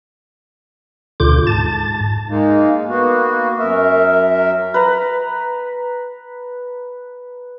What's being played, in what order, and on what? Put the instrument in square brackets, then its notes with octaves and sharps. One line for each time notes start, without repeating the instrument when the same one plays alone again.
[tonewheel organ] D2 B2 D3 F4 D6 G6
G#2 A5 A6
[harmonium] G#3 A#3 D#4
A#3 B3 F#4
F#2 A#4 E5
[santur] B4 A#5